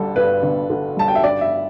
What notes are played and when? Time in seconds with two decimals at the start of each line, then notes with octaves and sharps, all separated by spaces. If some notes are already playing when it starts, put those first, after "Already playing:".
Already playing: G1 D3 G3 A4
0.16 G2 B4
0.43 G1
0.70 D3
0.97 G3 A5
1.08 G5
1.15 E5
1.23 G2 D5
1.41 E5